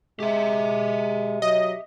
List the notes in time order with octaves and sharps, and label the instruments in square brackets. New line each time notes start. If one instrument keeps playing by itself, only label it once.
[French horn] G#3 [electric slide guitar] G4 E5
[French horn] F#3 [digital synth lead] D#5